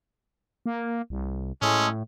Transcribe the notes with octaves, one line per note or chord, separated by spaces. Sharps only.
A#3
C2
A2 G#3 C#4 G#4 A4